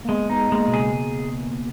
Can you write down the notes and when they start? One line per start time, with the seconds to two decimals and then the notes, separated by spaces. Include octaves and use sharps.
0.04 A#3
0.08 G#3 B3
0.30 B3 D#4
0.52 G#3 A#3
0.68 B2
0.73 C#3 G#4